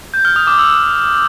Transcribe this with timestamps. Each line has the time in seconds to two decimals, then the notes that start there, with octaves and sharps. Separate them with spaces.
0.14 G6
0.25 F6
0.36 D#6
0.47 D6
0.58 E6